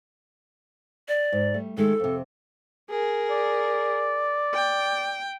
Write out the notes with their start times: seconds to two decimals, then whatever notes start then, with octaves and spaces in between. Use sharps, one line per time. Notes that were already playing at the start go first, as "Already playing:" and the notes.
1.08 D5
1.32 G#2
1.54 G3 A3
1.77 D#3 G#3 A3 A4
2.00 F2 C3
2.90 G#4 A#4
3.30 D5
4.54 G5